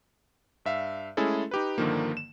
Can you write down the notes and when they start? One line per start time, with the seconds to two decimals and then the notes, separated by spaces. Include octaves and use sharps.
0.65 G2 E5 F5
1.17 G#3 A3 C#4 E4 G#4 A4
1.51 D#4 G4 B4
1.78 G2 D3 D#3 F3 A#3
2.17 E7